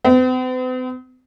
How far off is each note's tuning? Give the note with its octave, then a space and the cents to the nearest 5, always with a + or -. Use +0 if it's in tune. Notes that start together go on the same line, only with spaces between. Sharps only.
C4 -45